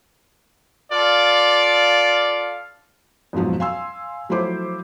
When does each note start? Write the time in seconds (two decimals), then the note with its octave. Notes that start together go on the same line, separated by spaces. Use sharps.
0.92 F4 A4 D5 F5
3.33 F2 G#2 B2 F3 F#3
3.60 F5 G#5 C6 E6
4.29 F3 F#3 A3 E4 C5 D6